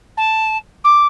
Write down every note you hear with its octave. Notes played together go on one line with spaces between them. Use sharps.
A5
D6